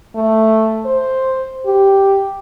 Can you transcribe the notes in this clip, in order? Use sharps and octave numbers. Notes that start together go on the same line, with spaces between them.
A3
C5
G4